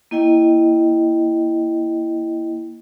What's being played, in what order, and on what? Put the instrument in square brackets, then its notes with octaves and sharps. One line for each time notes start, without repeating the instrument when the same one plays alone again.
[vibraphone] A#3 E4 D#5 G5